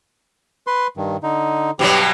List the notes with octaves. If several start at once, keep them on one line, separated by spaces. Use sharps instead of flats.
B4 C6
G2 D#3
D3 D#4
G2 B2 F#3 B3 G4